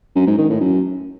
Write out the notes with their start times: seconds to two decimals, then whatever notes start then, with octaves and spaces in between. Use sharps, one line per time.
0.16 F#2
0.27 G#2
0.38 D#3
0.50 A2
0.61 F#2